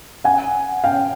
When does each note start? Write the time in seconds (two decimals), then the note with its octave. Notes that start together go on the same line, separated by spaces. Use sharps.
0.24 F#5 G#5
0.84 F5 G5